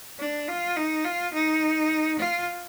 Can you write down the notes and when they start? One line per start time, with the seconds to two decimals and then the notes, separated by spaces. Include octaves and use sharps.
0.19 D4
0.48 F4
0.76 D#4
1.04 F4
1.33 D#4
2.19 F4